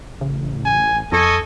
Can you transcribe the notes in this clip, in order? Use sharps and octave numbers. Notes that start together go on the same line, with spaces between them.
A1 C#3
G#5
F2 A4 D#5 G#5 C#6